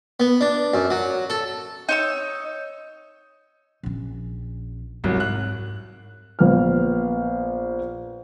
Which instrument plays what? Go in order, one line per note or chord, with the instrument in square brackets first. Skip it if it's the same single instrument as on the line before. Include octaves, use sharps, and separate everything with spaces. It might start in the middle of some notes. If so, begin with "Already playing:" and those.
[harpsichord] B3
D4
F#2
F#3
A4
[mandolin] D#4 C#5 E6
[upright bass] A#1 C#4
[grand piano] C2 F#3 [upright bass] G#2
[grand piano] F#6
A#1 B3 F6